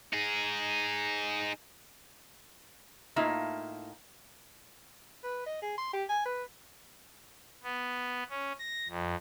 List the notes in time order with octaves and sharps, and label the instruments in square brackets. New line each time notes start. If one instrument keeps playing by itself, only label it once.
[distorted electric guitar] D#4 G#4
[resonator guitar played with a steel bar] A2 A#3 D#4 F4 E5
[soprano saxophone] B4
D#5
G#4
C6
G4
G#5
B4
[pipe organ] B3
C#4
A#6
F2